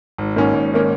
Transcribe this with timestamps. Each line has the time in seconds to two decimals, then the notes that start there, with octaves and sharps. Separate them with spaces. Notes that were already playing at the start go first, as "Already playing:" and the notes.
0.18 G#1
0.36 G#2 D#3 A#3 C#4
0.54 G#1
0.74 D#3 A#3 C#4